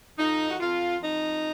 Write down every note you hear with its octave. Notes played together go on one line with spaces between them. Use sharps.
F2 D#4
F#4
F2 F4
F2 D#4